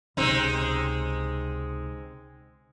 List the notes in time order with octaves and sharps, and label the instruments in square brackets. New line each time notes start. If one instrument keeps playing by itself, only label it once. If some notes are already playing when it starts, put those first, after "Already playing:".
[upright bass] C#2 C3 [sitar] G#3 C4 D#4